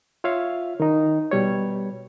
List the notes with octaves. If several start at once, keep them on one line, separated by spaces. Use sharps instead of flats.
F4 C#5 E5 F5
D#3 D#4
B2 G3 C#5